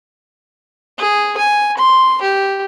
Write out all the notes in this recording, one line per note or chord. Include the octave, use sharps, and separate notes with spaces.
G#4
G#5
C6
G4